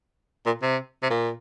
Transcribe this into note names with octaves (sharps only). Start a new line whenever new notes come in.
A#2
C3
C3
A#2